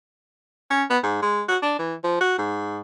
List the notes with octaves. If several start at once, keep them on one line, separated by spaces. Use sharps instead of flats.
C#4
B3
G#2
G#3
F#4
D4
E3
F3
F#4
G#2